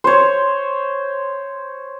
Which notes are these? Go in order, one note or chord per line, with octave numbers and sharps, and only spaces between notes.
C5 C#5